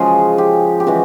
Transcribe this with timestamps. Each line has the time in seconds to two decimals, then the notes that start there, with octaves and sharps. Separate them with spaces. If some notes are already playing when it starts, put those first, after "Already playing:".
Already playing: C#3 F3 G#3 G#4
0.38 G4
0.80 G4
0.87 C#3 E3 G#3 F#4